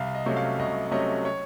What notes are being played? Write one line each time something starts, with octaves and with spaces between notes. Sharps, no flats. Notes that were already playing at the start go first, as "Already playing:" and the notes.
Already playing: C2 F5
D#5
C3 F#3 A3 C#4
F5
C2 D#5
C3 F#3 A3 C#4 D#5
C#5